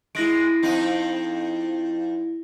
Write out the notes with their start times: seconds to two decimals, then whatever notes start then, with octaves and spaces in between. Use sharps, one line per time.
0.15 G#3 E4 A#6 D7
0.63 F2 C4 D#4